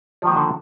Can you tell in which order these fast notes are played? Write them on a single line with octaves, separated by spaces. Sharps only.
F3 D#3 A#3 F#4 D3